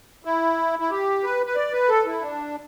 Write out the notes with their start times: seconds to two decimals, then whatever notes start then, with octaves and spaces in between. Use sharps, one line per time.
0.25 E4
0.79 E4
0.90 G4
1.24 B4
1.46 B4
1.55 D5
1.73 B4
1.89 A4
2.06 E4
2.21 D4